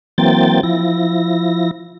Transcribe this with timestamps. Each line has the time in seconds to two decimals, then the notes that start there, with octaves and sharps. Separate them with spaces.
0.18 E3 F#3 A#3 C4 G5 A6
0.63 F3 E4 A#6